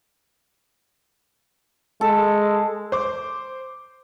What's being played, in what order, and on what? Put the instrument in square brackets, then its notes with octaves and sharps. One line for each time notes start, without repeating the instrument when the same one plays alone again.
[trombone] G#3 [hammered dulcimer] A4
[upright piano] C5 D6